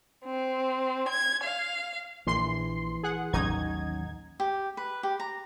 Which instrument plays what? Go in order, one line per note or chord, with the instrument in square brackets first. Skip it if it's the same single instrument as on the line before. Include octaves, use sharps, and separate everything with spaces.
[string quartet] C4
G#6
F5
[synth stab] A#1 C6 C7 [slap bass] E3
[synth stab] G#4 F#5
[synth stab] A1 D#4 G#6 [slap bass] D#2 F#3 C#4
[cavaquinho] G4
B4
G4
A#5